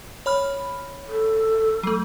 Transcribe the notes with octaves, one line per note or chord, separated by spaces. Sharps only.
C#5 B5 F6
A4
F#3 A3